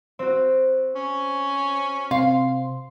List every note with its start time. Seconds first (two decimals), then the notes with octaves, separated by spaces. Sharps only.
0.19 C4 F#4
0.95 C#4
2.11 C3 C4 F5 C6